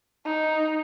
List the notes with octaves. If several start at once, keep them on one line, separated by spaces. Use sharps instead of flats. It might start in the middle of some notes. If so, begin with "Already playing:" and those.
D#4